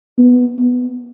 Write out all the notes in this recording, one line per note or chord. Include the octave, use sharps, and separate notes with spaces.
B3
B3